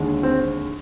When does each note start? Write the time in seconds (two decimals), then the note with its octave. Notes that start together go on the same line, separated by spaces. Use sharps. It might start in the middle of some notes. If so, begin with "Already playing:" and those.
Already playing: D#2 D3 G#3
0.23 C4